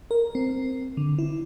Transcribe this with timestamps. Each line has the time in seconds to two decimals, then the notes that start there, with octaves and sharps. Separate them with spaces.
0.11 A#4
0.35 C4
0.97 D3
1.18 E4